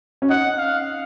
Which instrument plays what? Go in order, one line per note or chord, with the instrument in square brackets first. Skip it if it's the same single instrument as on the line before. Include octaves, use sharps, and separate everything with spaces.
[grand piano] C#4
[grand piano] D#4 [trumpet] F#5
[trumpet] F5